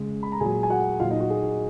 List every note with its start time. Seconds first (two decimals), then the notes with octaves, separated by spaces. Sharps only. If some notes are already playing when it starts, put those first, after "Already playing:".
Already playing: C#3 G#3
0.23 B5
0.32 A#5
0.40 A#2 F#3 G#4 G#5
0.63 G#5
0.70 F#4 F#5
1.00 A#2 F#3 F4 F5
1.10 D#4 D#5
1.20 F#4
1.30 G#4